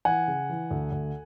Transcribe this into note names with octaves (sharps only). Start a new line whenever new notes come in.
E3 F#5 G#5
C#3
E3
D2
D2